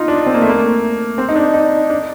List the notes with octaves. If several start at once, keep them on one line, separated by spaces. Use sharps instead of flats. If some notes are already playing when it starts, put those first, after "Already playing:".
Already playing: D#4 F4
D4
C4
A#3
A3
A#3
C4
D#4
D4
D#4
D4